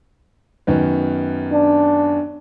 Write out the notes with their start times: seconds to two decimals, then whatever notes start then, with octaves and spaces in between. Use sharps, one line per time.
0.67 F#2 D#3 B3
1.52 D4